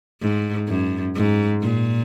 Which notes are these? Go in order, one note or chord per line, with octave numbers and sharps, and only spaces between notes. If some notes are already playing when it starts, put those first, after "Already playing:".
G#2
F#2
G#2
A#2